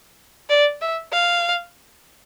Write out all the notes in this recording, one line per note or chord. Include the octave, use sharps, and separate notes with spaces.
D5
E5
F5